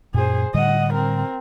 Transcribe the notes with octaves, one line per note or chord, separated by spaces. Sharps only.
F#2 A#2 G#4 C5
A2 D3 G3 D#5 F#5
C4 A#4